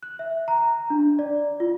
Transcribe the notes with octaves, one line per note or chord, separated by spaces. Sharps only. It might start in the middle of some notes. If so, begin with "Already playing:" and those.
F#6
E5
A#5
D4
D5
F4